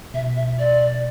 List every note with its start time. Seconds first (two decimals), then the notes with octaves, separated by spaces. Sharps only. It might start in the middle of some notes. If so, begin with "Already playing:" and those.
0.14 B2 E5
0.36 E5
0.59 D5